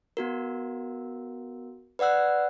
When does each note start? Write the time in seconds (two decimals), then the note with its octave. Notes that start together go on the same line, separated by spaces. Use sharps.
0.17 B3 F#4 A#4
1.99 B4 D5 F#5 E6 F#6